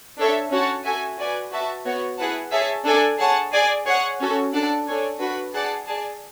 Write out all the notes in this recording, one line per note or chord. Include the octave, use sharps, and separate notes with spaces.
D4 A4 C#5 E5
C#4 F#4 C#5 F#5 A5
F#4 A4 E5 G#5
F#4 B4 D5 G#5
F#4 B4 E5 A5
B3 F#4 C#5
E4 G#4 B4 F#5 A5
G#4 C#5 E5 A5
D4 A4 D5 G#5
G#4 C#5 F#5 A5
G#4 D5 G#5
G#4 C#5 F#5
C#4 F#4 A4
D4 A4 D5 F#5 A5
D4 A4 C#5 G#5
D4 F#4 B4
G#4 D5 F#5 A5
G#4 D5 A5